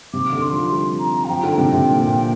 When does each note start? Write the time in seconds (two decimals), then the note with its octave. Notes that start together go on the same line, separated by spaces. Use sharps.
0.13 C3 D6
0.32 D3
0.41 C6
0.52 F3
0.71 G3
0.99 A#5
1.25 F5
1.29 F3 G5
1.43 D3
1.58 C3 G5
1.72 C3
1.87 A#2
2.06 A#2